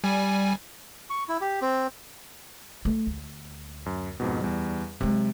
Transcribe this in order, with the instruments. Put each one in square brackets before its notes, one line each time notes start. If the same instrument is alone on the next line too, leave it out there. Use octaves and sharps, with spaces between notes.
[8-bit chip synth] G3 G#5
[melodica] C#6
E4
G4
C4
[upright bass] A3
D2
[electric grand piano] F#2
F2 G#2 B2
E2 G3
[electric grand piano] C3 [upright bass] F#3 G#3